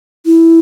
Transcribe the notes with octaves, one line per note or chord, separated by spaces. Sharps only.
E4